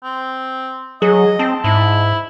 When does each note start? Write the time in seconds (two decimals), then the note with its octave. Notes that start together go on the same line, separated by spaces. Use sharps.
0.03 C4
1.02 F#3 G#4 D#5
1.39 C4 A5
1.64 G#2 E4